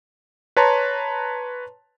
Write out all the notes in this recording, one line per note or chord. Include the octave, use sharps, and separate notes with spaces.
B4 C#5 A5 A#5 C6